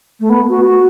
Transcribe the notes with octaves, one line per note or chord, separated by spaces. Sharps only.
A3
B3
F#4
F#4